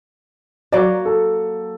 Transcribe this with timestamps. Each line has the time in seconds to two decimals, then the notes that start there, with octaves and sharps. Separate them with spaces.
0.72 F#3 A#3 D5
1.05 A4